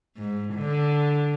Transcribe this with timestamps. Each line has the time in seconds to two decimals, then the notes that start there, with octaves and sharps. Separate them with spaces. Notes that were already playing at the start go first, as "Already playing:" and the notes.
0.17 G#2
0.55 D3